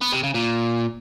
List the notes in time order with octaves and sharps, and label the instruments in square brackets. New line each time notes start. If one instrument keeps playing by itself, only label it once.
[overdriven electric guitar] B3
C3
C#3
A#2